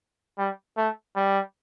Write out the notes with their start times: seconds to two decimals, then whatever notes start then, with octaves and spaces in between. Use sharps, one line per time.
0.38 G3
0.77 A3
1.16 G3